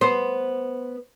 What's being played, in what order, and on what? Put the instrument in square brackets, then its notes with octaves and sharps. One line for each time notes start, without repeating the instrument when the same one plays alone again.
[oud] B3 C5